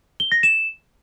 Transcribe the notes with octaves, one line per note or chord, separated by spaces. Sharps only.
G7
A#6
E7